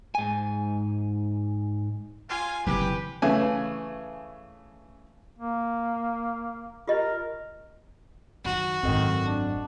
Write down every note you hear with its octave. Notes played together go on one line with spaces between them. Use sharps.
G#2 G#5
F4 F5 G#5
F#1 C3 E3 G4 B4
C#3 E3 A3 G#5
A#3
F4 G4 A#4 D#5
F#2 D#3 F#4
G#1 F#2 D#3 C4 A4 D#5
D4